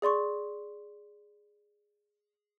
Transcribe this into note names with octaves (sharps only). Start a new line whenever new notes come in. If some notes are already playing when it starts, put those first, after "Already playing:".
G#4 D5 C6 C#6